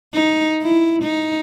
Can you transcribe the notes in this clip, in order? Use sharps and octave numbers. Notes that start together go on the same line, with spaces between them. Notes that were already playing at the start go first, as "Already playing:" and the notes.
D#4
E4
D#4